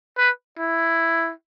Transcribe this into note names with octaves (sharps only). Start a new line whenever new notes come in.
B4
E4